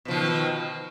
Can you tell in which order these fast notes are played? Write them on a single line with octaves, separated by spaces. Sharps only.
B2 F3 D#3